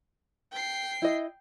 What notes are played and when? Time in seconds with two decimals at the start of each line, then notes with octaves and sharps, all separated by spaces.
0.51 G5 C7
1.02 E4 D#5